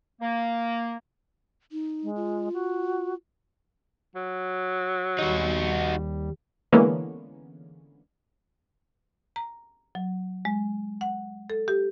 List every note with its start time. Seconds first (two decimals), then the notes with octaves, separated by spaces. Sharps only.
0.20 A#3
1.72 D#4
2.03 G#3
2.16 F4
2.53 F#4
4.15 F#3
5.19 D#2 G3 D#4 F#4
6.72 D3 E3 G#3 A#3 B3 C#4
9.36 A#5
9.95 F#3
10.45 G#3
11.01 F#5
11.50 A4
11.68 G4